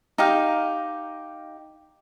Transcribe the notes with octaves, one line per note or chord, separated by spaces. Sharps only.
D#4 G4 F5